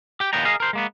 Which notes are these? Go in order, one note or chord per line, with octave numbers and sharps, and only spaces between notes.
G4 G5
D#2 A#2 B3 G5 A#5
G#4 A#4 D#5 F5
A#4 C5
G#3 A#3 B3